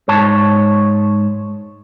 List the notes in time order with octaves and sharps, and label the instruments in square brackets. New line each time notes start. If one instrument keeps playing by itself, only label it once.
[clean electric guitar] G#2 C#5 A5